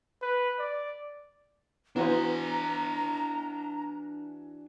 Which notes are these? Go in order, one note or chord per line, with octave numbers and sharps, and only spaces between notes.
B4
D5
E3 B3 D4 F#4 C5 G#5 A#5